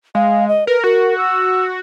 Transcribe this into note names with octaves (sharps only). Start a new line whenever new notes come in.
G#3 F5
D#5
A#4 B4
F#4 A#4
E6